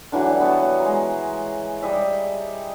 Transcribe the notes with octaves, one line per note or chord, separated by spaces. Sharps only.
D3 E3 F#3 G3
B3 C#5 A5
G#3 A#5
G3 D#5 E5